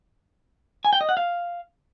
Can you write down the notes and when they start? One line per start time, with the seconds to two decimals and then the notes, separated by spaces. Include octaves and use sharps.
0.85 G#5
0.93 G5
1.01 D#5
1.09 F#5
1.17 F5